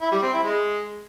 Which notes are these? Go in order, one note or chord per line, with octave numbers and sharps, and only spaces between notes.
E4
G3
C4
E4
G#3